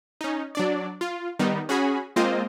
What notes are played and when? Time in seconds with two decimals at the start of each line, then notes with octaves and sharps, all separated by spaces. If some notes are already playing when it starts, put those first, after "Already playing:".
0.21 C#4 D#4
0.55 F#3 D4 D5
1.01 F4
1.39 D#3 G3 B3 D#4
1.69 C#4 F#4 G#4 G#5 B5
2.16 G#3 A#3 C4 F4 C5 D#5